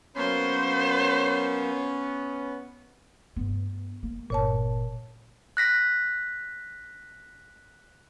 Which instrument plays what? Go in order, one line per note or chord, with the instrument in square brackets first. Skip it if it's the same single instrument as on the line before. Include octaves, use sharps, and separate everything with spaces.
[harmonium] F#3 A#3 [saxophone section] B3 C#4 [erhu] C5
[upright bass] G2 B3
A#3
[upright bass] G1 [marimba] A#2 C#5 A5
[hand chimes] F#6 A#6 B6